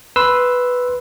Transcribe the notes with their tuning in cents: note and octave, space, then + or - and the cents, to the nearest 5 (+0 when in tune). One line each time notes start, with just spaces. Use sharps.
B4 +0 C6 +0 E6 +0